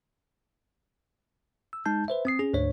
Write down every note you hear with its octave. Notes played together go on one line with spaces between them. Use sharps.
E6
G#3 D#4 A5 G6
B4 C5 E5
C4 D#6 C7
C#4 G#4
D2 G#2 D4 C#5